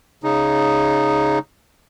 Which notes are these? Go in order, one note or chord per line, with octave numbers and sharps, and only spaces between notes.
C#3 D#4